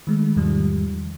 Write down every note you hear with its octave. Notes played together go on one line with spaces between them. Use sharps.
D#3 G#3 A3
E2 G#2 C3 D#3 F3 G3